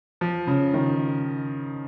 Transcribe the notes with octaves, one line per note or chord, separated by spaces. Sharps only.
F3
C#3
D#3